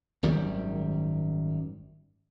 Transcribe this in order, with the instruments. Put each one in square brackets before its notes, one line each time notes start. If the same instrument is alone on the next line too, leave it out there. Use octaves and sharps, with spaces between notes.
[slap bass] G#1 F#2 D#3 G3